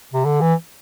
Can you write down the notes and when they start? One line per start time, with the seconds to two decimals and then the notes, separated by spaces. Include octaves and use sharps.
0.13 C3
0.25 D3
0.41 E3